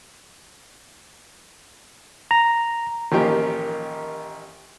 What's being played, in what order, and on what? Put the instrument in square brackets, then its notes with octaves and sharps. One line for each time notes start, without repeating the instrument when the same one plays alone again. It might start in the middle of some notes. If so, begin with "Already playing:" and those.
[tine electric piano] A#5
[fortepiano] A1 D#3 F3 A#3 G4